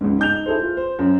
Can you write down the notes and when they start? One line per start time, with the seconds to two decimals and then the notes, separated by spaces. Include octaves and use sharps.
0.01 C#2 G#2
0.19 D#4 G6 F7
0.46 E4 G#4 A4 C5
0.60 F4
0.77 C5
0.99 F#2